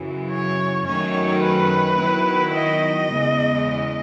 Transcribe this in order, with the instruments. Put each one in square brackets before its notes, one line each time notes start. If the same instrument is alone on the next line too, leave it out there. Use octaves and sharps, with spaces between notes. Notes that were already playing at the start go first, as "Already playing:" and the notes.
Already playing: [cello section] F#2 C#3 E3
[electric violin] C#5
[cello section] F#2 D#3 F#3 A3 C#4 [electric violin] C#5
[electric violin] B4
[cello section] D#3 F#3 B3 E4
[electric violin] D#5
[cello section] E2 C#3 G#3